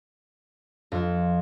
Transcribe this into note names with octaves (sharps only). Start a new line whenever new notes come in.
F2